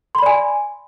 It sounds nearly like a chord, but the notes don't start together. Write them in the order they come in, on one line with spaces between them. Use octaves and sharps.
C6 B5 D5 G#5